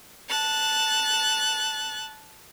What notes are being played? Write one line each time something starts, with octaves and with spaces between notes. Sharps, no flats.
A5 F#6